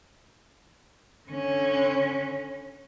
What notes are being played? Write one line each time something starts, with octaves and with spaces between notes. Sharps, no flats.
D3 C#4